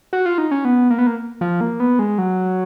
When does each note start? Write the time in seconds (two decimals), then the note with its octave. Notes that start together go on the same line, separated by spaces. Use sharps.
0.13 F#4
0.26 F4
0.38 D#4
0.51 C#4
0.65 B3
0.90 A#3
0.98 B3
1.07 A#3
1.41 F3
1.61 A#3
1.80 B3
1.99 G#3
2.18 F#3